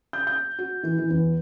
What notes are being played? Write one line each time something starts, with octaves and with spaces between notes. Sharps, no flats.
G6
G6
F#4
E3
E3
E2